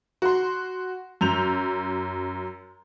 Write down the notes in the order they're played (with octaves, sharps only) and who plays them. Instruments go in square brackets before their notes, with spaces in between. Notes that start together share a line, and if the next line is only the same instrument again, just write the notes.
[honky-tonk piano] F#4 C6
F#2 G6 F7